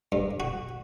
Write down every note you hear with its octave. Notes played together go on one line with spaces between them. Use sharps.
G2
F#4